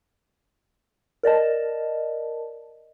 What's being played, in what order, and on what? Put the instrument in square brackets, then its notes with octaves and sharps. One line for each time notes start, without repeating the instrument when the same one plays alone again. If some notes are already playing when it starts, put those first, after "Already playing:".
[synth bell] A#4 D5 D#5 A5